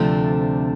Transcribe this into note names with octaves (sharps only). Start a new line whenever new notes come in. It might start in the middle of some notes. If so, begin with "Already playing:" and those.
Already playing: D2 C3 F3 A3 D4